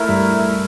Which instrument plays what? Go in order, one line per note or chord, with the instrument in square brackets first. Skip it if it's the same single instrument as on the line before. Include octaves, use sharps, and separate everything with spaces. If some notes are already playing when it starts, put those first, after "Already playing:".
Already playing: [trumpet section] A3 E4 A#4 E5
[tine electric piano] G2 G3